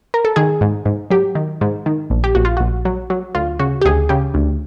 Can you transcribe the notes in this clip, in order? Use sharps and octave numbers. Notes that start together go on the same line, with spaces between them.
A#4
A4
D#3 G#4
G#2
G#2
F#3 G4
D#3
G#2
D#3
A#1
G4
A#1 F#4
F4
A#1 F#4
F#3
F#3
D2 F4
C#3 F#4
G4
D2 G#4
C#3 G4
D2